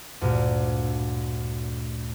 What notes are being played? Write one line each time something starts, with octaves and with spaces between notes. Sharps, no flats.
D2 G2 A#2